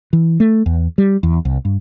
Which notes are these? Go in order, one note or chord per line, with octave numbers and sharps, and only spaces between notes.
E3
A3
E2
G3
E2
C2
G2